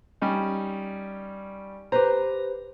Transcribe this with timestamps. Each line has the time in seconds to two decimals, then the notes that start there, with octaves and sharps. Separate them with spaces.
0.22 G3 C#4 D#4
1.92 G4 B4 C5 A#5